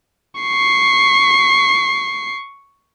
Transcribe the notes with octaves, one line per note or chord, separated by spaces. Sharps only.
C#6 C7